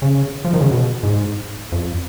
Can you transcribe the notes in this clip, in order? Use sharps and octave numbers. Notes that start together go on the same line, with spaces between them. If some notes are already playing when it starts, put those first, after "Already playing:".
C#3
F3
D#3
C#3
B2
G#2
F2